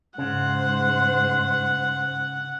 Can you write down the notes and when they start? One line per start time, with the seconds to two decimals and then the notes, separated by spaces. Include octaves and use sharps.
0.18 G#2 C#3 C5 F#5